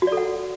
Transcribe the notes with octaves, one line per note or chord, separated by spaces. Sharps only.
F#4
D5
A4
F#5